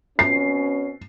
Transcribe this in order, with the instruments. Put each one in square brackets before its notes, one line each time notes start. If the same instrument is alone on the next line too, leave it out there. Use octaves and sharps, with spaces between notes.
[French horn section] B2 C4 C#4 [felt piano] C7